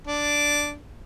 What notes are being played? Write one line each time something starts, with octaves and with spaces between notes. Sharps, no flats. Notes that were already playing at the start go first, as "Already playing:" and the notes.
D4